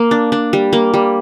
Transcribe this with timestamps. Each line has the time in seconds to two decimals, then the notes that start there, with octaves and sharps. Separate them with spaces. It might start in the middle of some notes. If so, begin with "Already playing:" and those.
Already playing: A#3
0.11 D4
0.32 D4
0.53 G3
0.73 A#3
0.94 G3